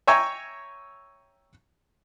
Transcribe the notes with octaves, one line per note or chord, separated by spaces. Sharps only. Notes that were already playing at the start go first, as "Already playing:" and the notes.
C#5 E5 G5 G#5 A#5 C#6